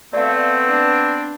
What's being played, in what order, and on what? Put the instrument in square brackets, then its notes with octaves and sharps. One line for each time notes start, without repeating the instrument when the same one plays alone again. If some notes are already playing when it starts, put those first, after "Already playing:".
[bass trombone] A3 [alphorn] B3 [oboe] C4 [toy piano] D5 F5
[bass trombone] D4